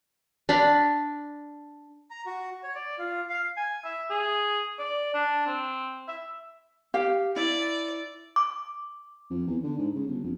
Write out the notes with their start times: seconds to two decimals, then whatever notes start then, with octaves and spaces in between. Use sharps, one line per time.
0.49 D4 F5 B5
2.10 A#5
2.26 F#4
2.63 C#5
2.75 D5
2.99 F4
3.29 F5
3.57 G#5
3.84 E5
4.11 G#4
4.79 D5
5.14 D4
5.46 C4
6.08 E5
6.94 G4 F5
7.36 E4 D5
8.36 D6
9.31 F2
9.47 E2
9.63 D3
9.78 G#2
9.95 C#3
10.07 G1
10.24 F2